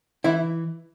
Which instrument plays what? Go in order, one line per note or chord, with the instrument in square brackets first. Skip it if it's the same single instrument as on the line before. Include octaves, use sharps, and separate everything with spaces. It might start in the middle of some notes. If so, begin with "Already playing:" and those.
[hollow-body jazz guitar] E3 E4